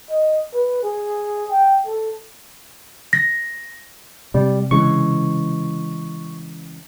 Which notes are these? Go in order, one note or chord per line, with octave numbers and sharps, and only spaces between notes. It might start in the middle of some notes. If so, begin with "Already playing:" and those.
D#5
B4
G#4
G5
A4
A#6
C3 G3
C#3 E3 G#3 C#6